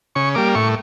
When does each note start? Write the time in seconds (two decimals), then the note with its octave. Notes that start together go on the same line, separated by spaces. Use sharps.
0.15 C#3 C#6
0.35 G3 A#3 D6
0.55 A2 C#6